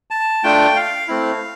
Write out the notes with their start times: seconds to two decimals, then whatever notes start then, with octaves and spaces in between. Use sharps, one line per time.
0.11 A5
0.44 A3 D4 F4 G5
0.76 F5
1.08 A3 C4 E4